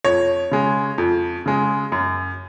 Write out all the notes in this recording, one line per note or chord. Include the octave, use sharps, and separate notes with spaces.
F2 C#5
C#3 G#3
F2
C#3 G#3
F#2